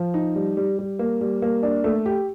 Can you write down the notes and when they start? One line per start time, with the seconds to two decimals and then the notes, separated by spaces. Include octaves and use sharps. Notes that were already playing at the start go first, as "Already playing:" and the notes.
Already playing: F3
0.14 D#4
0.36 G3
0.57 G3
0.79 G3
0.99 A#3
1.21 G3
1.42 A#3
1.63 D4
1.84 A3
2.06 G4